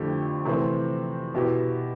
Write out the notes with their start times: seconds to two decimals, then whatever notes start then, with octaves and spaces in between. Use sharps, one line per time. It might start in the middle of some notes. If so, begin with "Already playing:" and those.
Already playing: F2 D3 A3 E4 G4
0.45 C3 E3 A3 C4
1.34 B2 B3 E4 G4